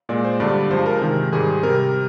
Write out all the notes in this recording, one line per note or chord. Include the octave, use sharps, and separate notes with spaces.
A#2 G#3 D5
C5
G2 D3 G3 D5
G2 F3 G#3 C5
A#4
C3 D#3 G#3
G#2 D#3 G3 G#4
C3 G3 A#4